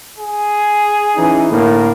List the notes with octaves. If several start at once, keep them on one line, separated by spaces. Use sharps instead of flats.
G#4
E3 C#4 D#4
A2 D3 A#3